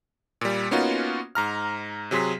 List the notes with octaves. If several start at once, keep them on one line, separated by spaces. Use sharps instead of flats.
A#2 G3
A#3 B3 C#4 D#4 F4 F#4
G#2 A#5 F6
C3 F#3 G#4 C6 B6